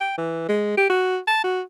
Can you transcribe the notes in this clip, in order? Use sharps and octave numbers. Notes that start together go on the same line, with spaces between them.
G5
E3
G#3
G4
F#4
A5
F#4